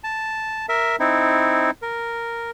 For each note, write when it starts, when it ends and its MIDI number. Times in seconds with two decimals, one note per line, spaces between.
0.04 0.66 81
0.69 0.96 70
0.69 0.96 76
1.00 1.71 60
1.00 1.71 63
1.00 1.71 64
1.82 2.51 70